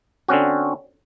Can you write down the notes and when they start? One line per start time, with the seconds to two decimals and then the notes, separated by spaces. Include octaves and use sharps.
0.28 D3 C4 C#4 F#4